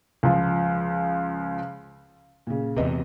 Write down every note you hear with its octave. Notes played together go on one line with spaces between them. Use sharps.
C#2 F3
A#2 C#3
E2 C3 B4 D#5